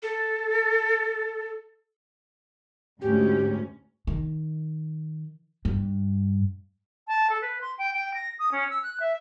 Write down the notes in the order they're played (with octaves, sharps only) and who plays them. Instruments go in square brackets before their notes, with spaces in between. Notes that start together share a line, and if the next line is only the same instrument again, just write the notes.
[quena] A4
[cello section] D2 G#2 C#4 [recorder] G4
[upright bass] D#3
G2
[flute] A5
A4
B4
C6
G5
G5
A#6
D#6
C#4
E6
F#6
E5